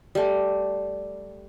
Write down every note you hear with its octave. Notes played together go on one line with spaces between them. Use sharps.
G3 A3